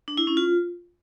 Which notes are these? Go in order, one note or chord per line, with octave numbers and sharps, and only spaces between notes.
D4
E4
C#4
F4